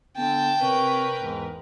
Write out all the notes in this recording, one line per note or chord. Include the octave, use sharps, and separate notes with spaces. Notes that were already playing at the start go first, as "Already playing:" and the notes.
D3 B3 G5 A5
C3 A#4 B4 C#5
E2 G#2